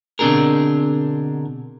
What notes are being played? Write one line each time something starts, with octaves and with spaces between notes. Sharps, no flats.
B2 D3 C4 D4 G#4 A#4